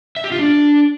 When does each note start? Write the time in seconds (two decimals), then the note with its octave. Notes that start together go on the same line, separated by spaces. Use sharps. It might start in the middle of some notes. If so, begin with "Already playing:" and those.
0.16 E5
0.24 G4
0.32 F4
0.39 D4